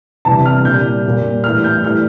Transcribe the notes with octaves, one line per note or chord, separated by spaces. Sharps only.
C3 E3 G3 A5
F6
A#2 G3 G6
A#2 G3
A2 E3 G3 F6
G6
A2 E3 G3 F6